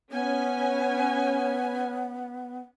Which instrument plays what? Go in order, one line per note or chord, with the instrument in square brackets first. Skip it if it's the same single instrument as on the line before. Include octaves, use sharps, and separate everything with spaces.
[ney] B3 [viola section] C#4 G#5